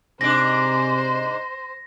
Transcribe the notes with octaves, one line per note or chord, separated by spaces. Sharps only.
G#2 C3 D4 C5 A#6